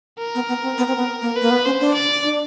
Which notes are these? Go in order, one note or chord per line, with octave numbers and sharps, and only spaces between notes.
A#4
B3
B3
C4
B3
C4
B3
A#3
B4
A#3
B3
C#4 C5
D4
D5
D4